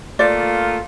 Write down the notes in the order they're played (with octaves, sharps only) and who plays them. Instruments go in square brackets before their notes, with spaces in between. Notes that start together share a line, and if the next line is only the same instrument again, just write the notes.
[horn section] A3 A#3 F4 [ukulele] D5